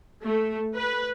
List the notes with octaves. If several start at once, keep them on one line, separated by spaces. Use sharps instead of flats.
A3
B4